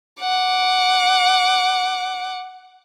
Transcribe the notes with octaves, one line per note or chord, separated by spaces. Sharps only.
F#5 D6